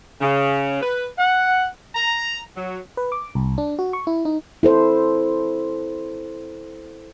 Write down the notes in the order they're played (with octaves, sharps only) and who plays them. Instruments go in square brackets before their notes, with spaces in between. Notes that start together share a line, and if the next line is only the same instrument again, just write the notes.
[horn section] C#3
B4
F#5
A#5
F#3
[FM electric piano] B4
D6
C2
D4
F#4
C#6
E4
D#4
[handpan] E4 A4 C5